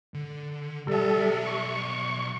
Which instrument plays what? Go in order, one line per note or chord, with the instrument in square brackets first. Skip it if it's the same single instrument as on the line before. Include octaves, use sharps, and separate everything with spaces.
[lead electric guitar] D3
[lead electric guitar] B1 E5 [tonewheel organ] G3 A4
[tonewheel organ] C#6